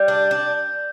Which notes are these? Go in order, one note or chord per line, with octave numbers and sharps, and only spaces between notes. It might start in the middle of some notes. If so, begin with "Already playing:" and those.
Already playing: G3 G6
D4
D4